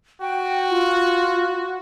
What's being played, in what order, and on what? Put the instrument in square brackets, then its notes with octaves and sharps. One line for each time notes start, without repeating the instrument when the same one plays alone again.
[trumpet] F#4 [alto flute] G5
[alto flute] F4